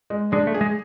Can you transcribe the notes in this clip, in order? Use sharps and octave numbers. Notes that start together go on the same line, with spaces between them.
G#3
G#3 D4
A3
G#4
G#3